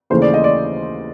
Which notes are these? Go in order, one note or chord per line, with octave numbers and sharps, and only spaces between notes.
D#2 C#3 E3 A3 C5
D5
D#5
D5